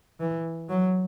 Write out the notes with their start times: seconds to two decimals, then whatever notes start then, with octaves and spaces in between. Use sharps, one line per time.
0.20 E3
0.69 F#3